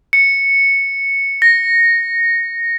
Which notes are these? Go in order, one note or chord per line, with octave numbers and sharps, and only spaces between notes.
C#7
A#6